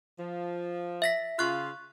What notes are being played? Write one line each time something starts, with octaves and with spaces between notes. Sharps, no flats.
F3
E5 A#6 B6
C#3 F4 C#6 F#6